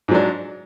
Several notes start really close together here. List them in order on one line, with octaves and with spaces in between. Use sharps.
G#2 F#3 D4